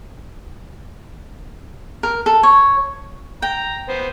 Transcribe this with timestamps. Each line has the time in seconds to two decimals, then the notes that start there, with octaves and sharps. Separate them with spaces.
2.03 A#4
2.26 A4
2.43 C#5
3.42 G5 A#5
3.89 B3 C5